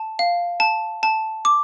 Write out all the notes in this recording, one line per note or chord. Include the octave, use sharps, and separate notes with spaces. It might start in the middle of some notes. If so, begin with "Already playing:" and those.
Already playing: A5
F5
A5
A5
D6